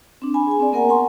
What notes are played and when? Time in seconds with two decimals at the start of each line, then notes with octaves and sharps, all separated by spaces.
0.22 C4 D4
0.34 G#5 B5
0.47 G#4 G#5
0.60 C4 D5
0.72 A#3 B3 A#4 F#5 G#5 A#5
0.89 F#5 G#5 A#5 C6 C#6